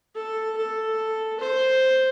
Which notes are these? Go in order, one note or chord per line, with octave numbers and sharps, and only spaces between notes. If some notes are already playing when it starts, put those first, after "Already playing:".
A4
A4
C5